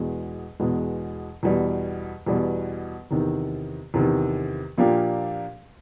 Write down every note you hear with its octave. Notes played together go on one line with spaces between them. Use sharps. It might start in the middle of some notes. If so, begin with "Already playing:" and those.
Already playing: E2 B2 G#3
E2 B2 G#3
E2 B2 G3
E2 B2 G3
E2 C3 D#3
E2 C3 D#3
A#2 F3 A#3 D4 G4